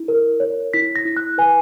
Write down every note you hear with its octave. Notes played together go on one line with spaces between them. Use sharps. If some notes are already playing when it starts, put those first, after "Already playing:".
Already playing: E4
A#4
C#5
E4 B6
A#6
E4
F#6
B4 G#5